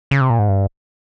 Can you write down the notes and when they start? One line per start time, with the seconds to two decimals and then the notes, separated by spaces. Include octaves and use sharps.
0.11 C#3
0.21 C3
0.30 A#2
0.39 G#2
0.49 G2